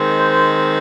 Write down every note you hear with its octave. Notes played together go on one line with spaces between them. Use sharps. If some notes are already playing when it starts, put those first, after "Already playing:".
Already playing: D#3 G#3 C4
C5